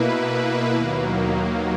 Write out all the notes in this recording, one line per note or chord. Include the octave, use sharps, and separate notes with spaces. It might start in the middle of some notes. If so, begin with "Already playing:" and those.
Already playing: B2 A#3 E4 B4
D#2 D#3 F#3 A#3